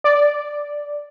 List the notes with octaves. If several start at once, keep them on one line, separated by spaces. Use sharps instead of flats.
D5